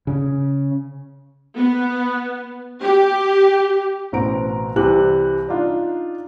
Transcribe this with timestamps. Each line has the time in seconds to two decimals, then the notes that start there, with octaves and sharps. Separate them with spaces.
0.07 C#3
1.57 B3
2.82 G4
4.12 A1 B2 C4 A#5 D7
4.76 C2 C3 E3 F#6 F#7
5.48 D4 D#4 F4